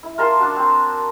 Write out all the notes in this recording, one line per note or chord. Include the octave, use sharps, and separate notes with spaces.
E4
F4 A#4 A5 C6
D4 F#4
C4